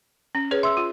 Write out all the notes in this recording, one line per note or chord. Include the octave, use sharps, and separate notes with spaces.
C#4
G#4 B4 C#5
E5 C6 E6
F4